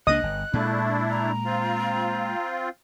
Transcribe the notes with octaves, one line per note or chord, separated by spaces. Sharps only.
C#2 A#3 D4 D#5 D#6 F#6
G1
A#2 G#3 A3 D4 E4
A#5
C4 F4